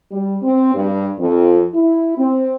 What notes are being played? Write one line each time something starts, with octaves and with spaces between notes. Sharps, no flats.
G3
C4
G2
F2
E4
C4